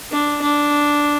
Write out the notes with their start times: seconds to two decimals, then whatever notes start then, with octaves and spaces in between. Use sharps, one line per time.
0.12 D4
0.42 D4